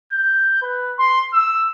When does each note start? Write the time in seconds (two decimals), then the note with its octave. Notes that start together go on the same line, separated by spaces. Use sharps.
0.12 G6
0.61 B4
0.99 C6
1.33 E6